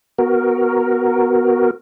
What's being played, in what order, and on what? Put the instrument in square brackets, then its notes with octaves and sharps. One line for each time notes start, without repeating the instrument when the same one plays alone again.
[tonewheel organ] B3 F#4 A#4